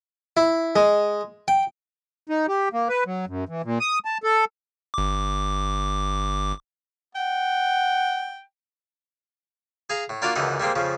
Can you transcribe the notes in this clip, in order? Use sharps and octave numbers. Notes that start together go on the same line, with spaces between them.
E4
G#3
G5
D#4
G4
A#3
B4
F#3
F#2
E3
A#2
D#6
A5
A4
G1 D6
F#5 G5
G#4 F5 A#5
A2
A#3 D4 F4 F#4 A#4 F5
C#2 F#2 D3 E3 D#4 F#5
G3 G#3 A#3 C4
F2 C#3 F3